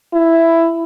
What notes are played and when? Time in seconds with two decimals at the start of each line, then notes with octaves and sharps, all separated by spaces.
0.14 E4